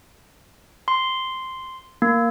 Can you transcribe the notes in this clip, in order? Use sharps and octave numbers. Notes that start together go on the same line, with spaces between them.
C6
A#3